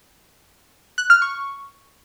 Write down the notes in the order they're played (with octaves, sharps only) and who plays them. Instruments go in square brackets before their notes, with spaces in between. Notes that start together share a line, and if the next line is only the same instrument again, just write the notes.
[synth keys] F#6
F6
C#6